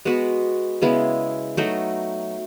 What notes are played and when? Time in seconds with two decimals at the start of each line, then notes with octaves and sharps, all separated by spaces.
0.05 G#3 B3 F#4 B4
0.82 C#3 G#3 B3 E4
1.57 F#3 A3 D#4 F#4